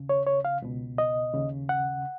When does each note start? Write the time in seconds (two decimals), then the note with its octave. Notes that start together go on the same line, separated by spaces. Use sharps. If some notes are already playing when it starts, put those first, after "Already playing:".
Already playing: D#2 C#3
0.09 C#5
0.27 C#5
0.45 F5
0.62 C#2 B2
0.98 D#5
1.33 D#2 C#3
1.69 F#5